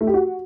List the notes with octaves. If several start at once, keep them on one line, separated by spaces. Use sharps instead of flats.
A3
G4
F#4